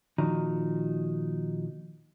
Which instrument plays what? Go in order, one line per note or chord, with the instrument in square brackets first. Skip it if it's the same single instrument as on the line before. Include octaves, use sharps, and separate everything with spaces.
[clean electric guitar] A#2 D#3 F3 D#4 F#4 A#5